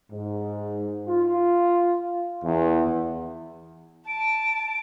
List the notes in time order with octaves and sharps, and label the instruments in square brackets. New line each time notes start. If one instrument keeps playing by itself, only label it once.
[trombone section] G#2
F4
E2
[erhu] A5 [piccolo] D7